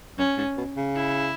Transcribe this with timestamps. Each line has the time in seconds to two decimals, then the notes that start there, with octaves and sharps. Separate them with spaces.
0.18 F#2 C#4
0.37 G#2
0.57 B2
0.77 C#3
0.96 E4